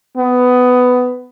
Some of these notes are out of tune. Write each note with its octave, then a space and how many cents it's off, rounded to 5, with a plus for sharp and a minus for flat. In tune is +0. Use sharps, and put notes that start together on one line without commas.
B3 +15